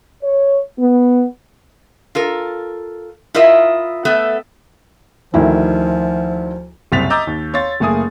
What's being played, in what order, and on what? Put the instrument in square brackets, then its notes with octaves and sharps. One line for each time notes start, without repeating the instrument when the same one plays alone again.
[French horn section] C#5
B3
[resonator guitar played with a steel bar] F4 A4 A#4
E4 F4 A#4 D#5 E5
A3 B3 A4 E5
[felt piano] D2 D#3 E4 [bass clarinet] F3
[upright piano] F#1 C2 C4 A6 B6 F7
D#5 A#5 D6 E6 G6 A6
D#2
C#5 F5 C6 A6
F#1 A3 A#3 G#4 G#5 D#6